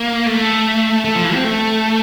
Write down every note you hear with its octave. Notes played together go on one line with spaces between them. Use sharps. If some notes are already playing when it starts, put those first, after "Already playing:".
Already playing: A#3
A3
A3
F3
E3
C4
A3